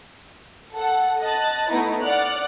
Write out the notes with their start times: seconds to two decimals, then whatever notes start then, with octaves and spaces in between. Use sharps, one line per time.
0.75 A4 F#5
1.21 D#5 A5 F#6 A6
1.69 A3 B3 D#4 E4
2.02 D5 F#5 F6 F#6